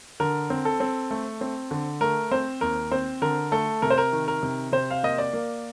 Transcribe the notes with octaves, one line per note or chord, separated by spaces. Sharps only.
D3 A#4
C4
A4
C4
A3
C4
D3
A3 A#4
C4 C5
D#2 A#4
C4 C5
D3 A#4
A3 A4
C3 A#4
C5
A#4
D#3
A#4
C3
C3 C5
F5
A#3 D#5
D5
A#3